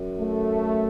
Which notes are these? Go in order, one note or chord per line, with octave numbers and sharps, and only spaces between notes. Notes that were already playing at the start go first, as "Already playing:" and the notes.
Already playing: F#2
A3